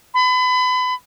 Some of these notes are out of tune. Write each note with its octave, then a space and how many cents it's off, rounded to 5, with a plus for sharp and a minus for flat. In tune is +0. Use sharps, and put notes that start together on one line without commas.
B5 +35